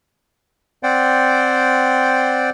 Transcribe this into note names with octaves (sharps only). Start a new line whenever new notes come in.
C4 C5 D5 F#5 G5